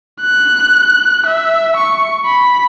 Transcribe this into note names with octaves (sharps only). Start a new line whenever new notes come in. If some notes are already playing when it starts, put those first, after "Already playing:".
F#6
E5
C#6
B5